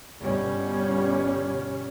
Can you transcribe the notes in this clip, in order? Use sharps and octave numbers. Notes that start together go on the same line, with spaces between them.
G1 B2 G3 C#4